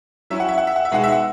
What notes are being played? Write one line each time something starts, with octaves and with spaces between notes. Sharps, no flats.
F#3 C#4 E4 E5
F#5
E5
F#5
E5
F#5
E5
B2 G#3 D#4 F#5
E5
F#5